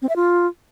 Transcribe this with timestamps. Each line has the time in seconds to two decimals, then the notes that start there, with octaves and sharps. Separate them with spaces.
0.02 C4
0.09 E5
0.16 F4